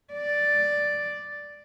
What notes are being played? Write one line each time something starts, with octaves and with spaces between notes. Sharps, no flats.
D5